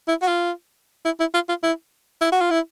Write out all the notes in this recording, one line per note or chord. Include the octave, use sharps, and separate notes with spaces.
E4
F#4
F4
E4
E4
F4
F4
E4
E4
F#4
F4
E4